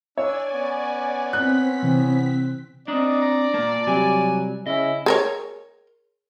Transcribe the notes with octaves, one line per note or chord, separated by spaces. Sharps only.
D4 C#5 D5 G#5 E6
B3 C#4
C4 F#6 B6
C3 E3
C4 D4 D#4 D5
A#5
A#2 A#3 A5
C3 F#3 G3 G#5
C#3 C#4 E4 D#5
G#4 A#4 C#5